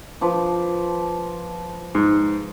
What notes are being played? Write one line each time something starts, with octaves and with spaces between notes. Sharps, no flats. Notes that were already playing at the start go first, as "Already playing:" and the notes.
F3 B4 D6
G#2